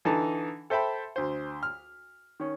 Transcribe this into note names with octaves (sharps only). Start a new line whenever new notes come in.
D3 E3 D#4 A4 A5
A4 C5 E5 G5 A5 B5
D2 C5
F6
D#3 C#4